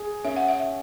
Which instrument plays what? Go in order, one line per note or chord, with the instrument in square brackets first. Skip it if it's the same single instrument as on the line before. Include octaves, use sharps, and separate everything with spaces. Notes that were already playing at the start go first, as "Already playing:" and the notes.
Already playing: [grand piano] G#4
[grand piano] C#4 [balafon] E5
[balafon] F#5
E5